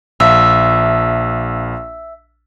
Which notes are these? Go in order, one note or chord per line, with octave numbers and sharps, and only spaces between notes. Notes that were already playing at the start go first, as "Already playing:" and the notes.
A#1 E5 F5 A5